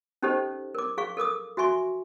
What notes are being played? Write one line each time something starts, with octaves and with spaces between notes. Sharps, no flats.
C#4 D#4 G4 A4 C5 D#5
A#4 D6
G#4 F5 C#6
A4 A#4 D6 D#6
F#4 E5 G#5 C6 C#6